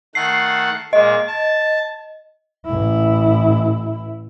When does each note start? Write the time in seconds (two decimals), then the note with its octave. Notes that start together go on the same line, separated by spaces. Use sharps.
0.15 D#3 A3 F#5 C7
0.93 A#2 G#3 D#5
1.27 A5
2.66 A1 E4